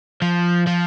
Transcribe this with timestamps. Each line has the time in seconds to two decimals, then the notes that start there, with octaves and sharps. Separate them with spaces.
0.22 F3
0.67 F3